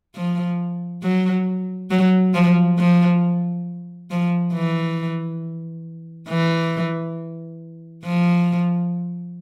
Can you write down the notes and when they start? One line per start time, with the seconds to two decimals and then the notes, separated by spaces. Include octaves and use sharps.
0.16 F3
1.03 F#3
1.91 F#3
2.34 F3
2.79 F3
4.11 F3
4.54 E3
6.29 E3
8.05 F3